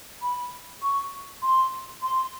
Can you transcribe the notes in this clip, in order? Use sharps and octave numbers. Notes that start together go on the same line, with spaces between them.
B5
C#6
C6
C6